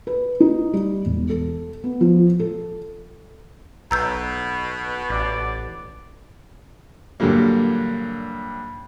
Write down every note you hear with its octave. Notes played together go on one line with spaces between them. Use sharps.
B4
D#4
G3
E1
A4
B3
F3
A4
B1 B2 A#5 E6 G6
A1 D5
G2 A#2 D3 F#3 G3 A#3